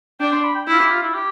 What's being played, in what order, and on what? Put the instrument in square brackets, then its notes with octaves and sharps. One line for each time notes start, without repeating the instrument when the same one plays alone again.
[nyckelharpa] D4 [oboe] G5
[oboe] C6
B5
G5
[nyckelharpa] E4 [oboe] F4
[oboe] G4
F4
E4
G4